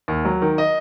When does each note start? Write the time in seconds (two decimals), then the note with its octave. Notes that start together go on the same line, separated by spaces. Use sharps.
0.08 D#2
0.25 F#3
0.42 D#3
0.58 D#5